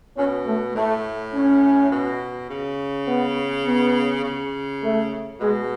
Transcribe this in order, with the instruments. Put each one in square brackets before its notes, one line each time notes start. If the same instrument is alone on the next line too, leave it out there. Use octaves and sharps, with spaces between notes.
[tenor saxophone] B2 [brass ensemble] C#4
[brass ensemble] A3
[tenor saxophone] A2 [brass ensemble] A3
[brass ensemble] C#4
[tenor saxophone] B2
C#3
[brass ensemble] B3
B3
[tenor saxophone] C#3
[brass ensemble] A3
[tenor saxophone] B2 [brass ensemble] G#3